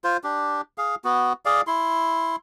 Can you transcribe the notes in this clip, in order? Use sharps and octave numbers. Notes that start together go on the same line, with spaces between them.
F4 C5
D4 G4
G#4 F5
B3 F#4
G#4 D5 F5
E4 C6